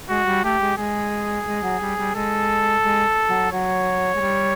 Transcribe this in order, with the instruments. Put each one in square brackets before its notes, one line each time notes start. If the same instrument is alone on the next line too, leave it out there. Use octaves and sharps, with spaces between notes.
[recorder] G#3 [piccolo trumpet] F#4
[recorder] G3
[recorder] A3 [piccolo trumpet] G4
[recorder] G#3
[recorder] G#3 [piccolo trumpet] G#4
[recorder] G#3
F#3
G3
G3
[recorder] G#3 [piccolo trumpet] A4
[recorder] G#3
F#3
[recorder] F#3 [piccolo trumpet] C#5
[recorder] G#3
G3